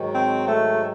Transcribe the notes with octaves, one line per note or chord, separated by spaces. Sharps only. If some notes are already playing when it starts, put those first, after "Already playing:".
Already playing: G#2 D#3 F#3
C4
A3